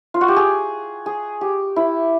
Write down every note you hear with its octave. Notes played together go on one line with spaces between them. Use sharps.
F4
F#4
G4
G#4
G#4
G4
E4